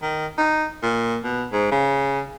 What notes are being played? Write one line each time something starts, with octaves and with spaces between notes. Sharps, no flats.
D#3
D#4
A#2
B2
G#2
C#3